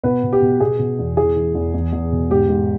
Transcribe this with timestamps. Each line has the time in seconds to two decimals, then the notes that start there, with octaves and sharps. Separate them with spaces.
0.03 B2 B3 B4
0.23 B2
0.33 G4
0.42 B2
0.60 B2 G#4
0.79 B2
0.99 E2
1.17 E3 G#4
1.36 E3
1.55 E2
1.74 E2
1.92 E2
2.12 B2
2.30 G#2 G4
2.49 G#2